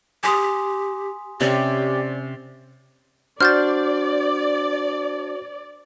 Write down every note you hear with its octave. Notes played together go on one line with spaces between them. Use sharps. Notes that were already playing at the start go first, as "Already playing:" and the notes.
G4 G#5 C6 D#6
C3 C#4 G4 D5
D4 F#4 C5 D5 F6 G6 A6